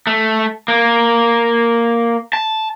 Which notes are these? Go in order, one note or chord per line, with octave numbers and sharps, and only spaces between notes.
A3
A#3
A5